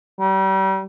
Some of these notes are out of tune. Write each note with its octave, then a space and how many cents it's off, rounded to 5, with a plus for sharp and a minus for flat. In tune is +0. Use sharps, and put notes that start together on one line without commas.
G3 -30